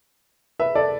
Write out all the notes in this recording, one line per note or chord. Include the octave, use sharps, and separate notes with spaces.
B4 E5
A4 D5